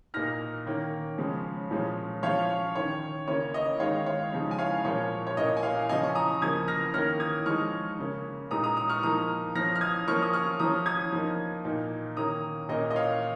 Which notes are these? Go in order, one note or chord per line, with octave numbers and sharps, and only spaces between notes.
A#2 A#3 D#4 F6 A#6
D#3 A#3 C#4
C#3 F3 G#3 C#4
A#2 F3 G#3 C#4
F3 C#4 C#5 F5
D#3 C#4 C#5
C#3 A#3 C#4 C#5
D#5
D#3 G#3 D#4 C#5 F5
C#5 F5
C#3 F3 G#3 D#4
G#5
C#5 F5
A#2 F3 A#3 C#4 C#5
C#5
A#2 A#3 C#4 D#5
G#5
C#5 F5
C#3 F3 C#4 D#5 G#5
C#6
A#5 D#6
C#3 F3 A#3 D#6 G#6
F6 A#6
D#3 A#3 C#4 F6 A#6
D#6 G#6
F3 G#3 D#4 C#6 F6
C#3 A#3 C#4
A#2 G#3 D#4 A#5 D#6
A#5 D#6
A#5 D#6
C#6 F6
F3 A#3 D#4 A#5 D#6
F3 C#4 F6 A#6
F6
D#6 G#6
F3 A#3 C#4 C#6 F6
D#6
C#6 F6
F3 C#4 A#5 D#6
D#6 G#6
F3 A#3 D#4
A#2 A#3 D#4
D#3 A#3 C#4 A#5 D#6
A#2 A#3 C#4 D#5
D#5
C#5 F5